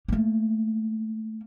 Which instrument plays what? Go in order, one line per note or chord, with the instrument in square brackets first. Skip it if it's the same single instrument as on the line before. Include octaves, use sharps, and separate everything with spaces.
[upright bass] A3 A#3